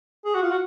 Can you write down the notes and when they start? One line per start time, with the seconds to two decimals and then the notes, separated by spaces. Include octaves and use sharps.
0.25 G#4
0.34 F#4
0.42 F4
0.51 F#4